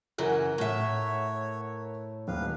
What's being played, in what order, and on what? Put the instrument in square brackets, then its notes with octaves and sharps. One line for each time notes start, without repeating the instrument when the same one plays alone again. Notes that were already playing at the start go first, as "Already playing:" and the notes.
[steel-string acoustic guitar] F#2 C#3 E3 [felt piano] A#4 F#5
[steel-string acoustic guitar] A2 E5 [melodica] C#5
[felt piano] D#1 [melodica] B4 F5